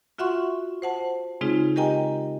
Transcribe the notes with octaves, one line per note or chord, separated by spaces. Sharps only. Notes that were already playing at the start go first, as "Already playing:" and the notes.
F4 F#4 E5 F#5 C6 C#6
C5 F#5 A5
C#3 G#3 C4 D#4 F4 G#4
G4 A#4 D#5 G5 G#5 A#5